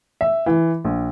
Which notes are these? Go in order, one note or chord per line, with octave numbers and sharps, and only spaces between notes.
E5
E3
A#1